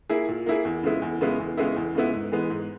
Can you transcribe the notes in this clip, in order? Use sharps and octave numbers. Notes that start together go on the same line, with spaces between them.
A#3 E4 G#4
A#2
A#3 E4 G#4
E2
C#3 G#3 B3 E4
E2
C#3 G#3 B3 E4
E2
C#3 G#3 B3 E4
E2
C#3 G#3 B3 E4
G#2
E3 G#3 B3
G#2